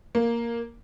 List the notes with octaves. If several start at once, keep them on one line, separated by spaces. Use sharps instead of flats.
A#3